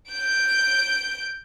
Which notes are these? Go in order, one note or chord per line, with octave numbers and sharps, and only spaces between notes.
G6 D7